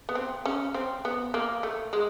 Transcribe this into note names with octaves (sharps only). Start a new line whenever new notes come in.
B3
C4
C#4
C4
B3
A#3
A3
G#3